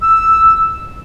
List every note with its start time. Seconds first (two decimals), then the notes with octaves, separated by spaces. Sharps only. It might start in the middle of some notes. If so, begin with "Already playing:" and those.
0.02 E6